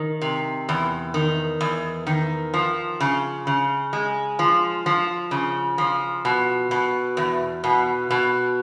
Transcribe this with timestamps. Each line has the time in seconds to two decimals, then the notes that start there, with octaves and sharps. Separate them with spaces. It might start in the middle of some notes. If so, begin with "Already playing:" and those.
Already playing: D#3
0.22 C3
0.69 E2
1.14 D#3
1.61 E2
2.07 D#3
2.54 F3
3.01 C#3
3.47 C#3
3.93 G#3
4.39 F3
4.86 F3
5.31 C#3
5.78 F3
6.25 B2
6.71 B2
7.17 E2
7.64 B2
8.11 B2